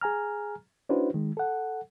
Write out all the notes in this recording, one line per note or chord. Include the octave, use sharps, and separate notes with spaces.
G#4 G#5 A#5 F6
C#4 D4 E4 F#4 B4 C5
D#3 G#3
A4 F#5